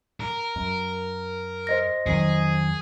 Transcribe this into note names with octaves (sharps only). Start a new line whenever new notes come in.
A#4
F#2
C5 D#5 A#6
F2 D#3 F#3 G#4